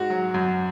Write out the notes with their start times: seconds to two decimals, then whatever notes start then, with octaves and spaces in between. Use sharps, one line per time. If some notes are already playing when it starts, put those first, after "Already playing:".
Already playing: G#2 F#4
0.10 F#3
0.34 F#2